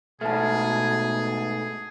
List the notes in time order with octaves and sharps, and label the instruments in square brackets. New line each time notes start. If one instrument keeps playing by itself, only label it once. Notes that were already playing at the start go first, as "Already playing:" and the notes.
[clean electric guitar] G#2 A3 [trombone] B2 [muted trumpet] G#4 [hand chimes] A5 F6